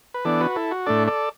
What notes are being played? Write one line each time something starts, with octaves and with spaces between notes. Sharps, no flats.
B4
E3 B3 D4 A4 D5
F#4 B4
E4 A4
F#4
A2 A3 D4 A4 D5
A4 D5